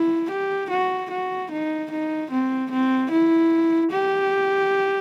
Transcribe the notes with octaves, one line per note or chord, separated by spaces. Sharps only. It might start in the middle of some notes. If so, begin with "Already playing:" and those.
Already playing: E4
G4
F#4
F#4
D#4
D#4
C4
C4
E4
G4